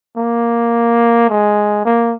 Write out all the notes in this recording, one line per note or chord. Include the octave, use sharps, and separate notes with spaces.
A#3
G#3
A#3